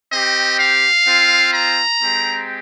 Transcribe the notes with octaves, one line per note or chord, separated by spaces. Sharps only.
C4 G4 D#5
F5
C4 F4
A#5
G#3 C4 G4